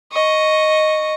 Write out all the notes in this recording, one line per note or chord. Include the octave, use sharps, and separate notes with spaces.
D#5 C#6